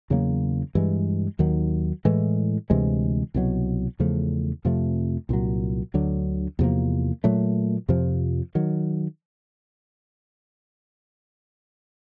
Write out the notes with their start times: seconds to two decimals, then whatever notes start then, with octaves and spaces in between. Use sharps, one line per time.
0.10 E2 C#3 F#3 A#3
0.75 G2 E3 G#3
1.39 D#2 D#3 F#3
2.05 A2 E3 G#3
2.70 D2 C3 E3 G#3
3.34 C2 B2 F#3
3.99 E2 C#3 F3 A3
4.65 F2 C3 F3 A3
5.29 C2 A#2 F#3
5.94 D2 D3 F#3
6.59 E2 C3 F3 A#3
7.24 A#2 F#3 A3
7.89 F2 C3 F3
8.55 D#3 F#3